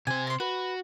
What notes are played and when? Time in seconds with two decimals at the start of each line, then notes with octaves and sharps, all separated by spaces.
0.07 C3 C5 G#5
0.27 A#5 C6
0.40 F#4 B4